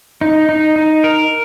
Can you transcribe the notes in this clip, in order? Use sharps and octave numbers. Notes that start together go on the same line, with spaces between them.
D#4
D#4
D#4
A#4